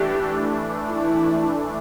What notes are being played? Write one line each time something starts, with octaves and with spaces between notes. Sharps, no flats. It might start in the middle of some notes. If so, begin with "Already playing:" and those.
Already playing: E3 A3 D4 G4
E4